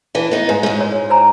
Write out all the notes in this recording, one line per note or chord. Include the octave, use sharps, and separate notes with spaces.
E3 D4
B3 D#4
G#2
G#2 G#3
C#5
C5 G#5 A#5